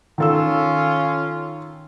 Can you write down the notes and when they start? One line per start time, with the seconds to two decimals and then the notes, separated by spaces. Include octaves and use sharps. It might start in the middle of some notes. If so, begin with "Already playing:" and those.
0.18 D#3 C#4 F4 A4 E6